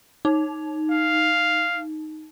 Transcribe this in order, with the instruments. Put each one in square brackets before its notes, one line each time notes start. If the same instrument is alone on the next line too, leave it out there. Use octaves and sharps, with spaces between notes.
[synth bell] D#4
[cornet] F5